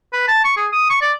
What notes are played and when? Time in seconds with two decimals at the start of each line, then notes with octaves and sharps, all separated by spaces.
0.13 B4
0.28 A5
0.45 C#6
0.57 G#4
0.73 D#6
0.90 C#6
1.01 D5